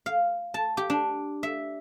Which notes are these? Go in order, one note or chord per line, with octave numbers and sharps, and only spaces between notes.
F5
A5
G4
D4
E5